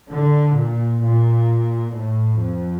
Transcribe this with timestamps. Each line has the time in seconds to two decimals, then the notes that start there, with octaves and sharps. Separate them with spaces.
0.10 D3
0.56 A#2
1.02 A#2
1.94 A2
2.40 F2